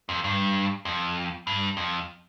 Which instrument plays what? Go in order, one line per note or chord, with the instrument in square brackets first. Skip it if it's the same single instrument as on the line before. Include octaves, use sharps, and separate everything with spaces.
[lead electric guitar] F2
G2
F2
G2
F2